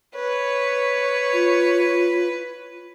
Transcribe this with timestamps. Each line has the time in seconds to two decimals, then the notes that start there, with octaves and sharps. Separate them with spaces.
0.16 B4 C#5
1.33 F4